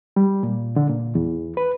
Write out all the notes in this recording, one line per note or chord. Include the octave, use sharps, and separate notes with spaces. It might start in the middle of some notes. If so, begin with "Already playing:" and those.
G3
A#2
D3
A#2
E2
B4